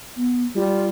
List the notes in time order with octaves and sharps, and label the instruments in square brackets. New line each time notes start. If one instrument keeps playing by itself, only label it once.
[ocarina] B3
[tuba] G3 [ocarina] F4